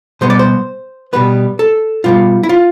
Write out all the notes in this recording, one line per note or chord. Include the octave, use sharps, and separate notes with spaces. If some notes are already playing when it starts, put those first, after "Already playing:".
B2 G3 B3 C5
D5
C5
B2 G3 B3 B4
A4
B2 G3 B3 F4
E4
F4